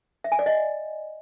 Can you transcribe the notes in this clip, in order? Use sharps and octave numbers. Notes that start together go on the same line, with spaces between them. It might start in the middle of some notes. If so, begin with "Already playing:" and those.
E5
G#5
D5
D#5